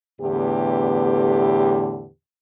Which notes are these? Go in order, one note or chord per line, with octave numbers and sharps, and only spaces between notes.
E2 A2 D3 B3 G4